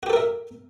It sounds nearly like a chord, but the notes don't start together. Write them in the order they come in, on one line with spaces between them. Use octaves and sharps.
F#4 G4 A4 A#4 E5